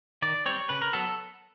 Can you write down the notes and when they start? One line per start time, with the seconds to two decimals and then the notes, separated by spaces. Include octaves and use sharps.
0.22 D#3 D5
0.46 G3 C4 C#5
0.69 C#3 B4
0.82 A#4
0.93 F#3 B3 A4